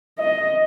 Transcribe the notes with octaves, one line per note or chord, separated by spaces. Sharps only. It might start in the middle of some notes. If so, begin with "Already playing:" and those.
D#5